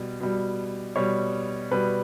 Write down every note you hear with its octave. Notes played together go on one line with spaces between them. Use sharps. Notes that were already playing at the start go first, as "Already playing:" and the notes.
Already playing: B2 G3
B2 G3
B2 G3 C#5
B2 G3 B4